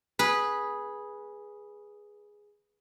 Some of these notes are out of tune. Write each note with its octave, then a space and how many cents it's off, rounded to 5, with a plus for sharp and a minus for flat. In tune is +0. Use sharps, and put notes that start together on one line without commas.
G#4 +0 B4 -15